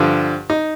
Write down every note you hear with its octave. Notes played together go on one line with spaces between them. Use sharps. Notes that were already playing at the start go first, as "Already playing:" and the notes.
Already playing: G2 D3 F3
D#4